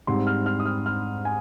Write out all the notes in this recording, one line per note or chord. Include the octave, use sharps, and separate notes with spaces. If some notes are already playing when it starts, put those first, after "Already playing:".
G#2 G3 C4 C6
F6
F6
D#6
F6
F6
G#5